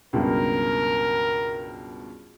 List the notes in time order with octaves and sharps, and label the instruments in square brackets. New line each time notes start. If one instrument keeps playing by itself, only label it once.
[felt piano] C#2 G2 B2 [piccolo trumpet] A#4